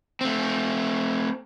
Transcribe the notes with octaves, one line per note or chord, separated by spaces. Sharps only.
A3 C4